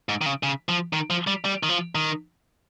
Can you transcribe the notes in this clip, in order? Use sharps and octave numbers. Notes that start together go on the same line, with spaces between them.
G#2
D#3
C#3
C#3
F3
D#3
F3
G3
G3
D#3
F3
D#3